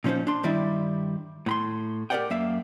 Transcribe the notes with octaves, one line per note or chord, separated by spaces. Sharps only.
A#2 F3 C#4 D#4 C5
D4 C6
G2 D#3 G3 E4 D5 E5
A2 B5 C6
G4 A#4 B4 D5 F#5 G5
F#2 A#3 E5 F5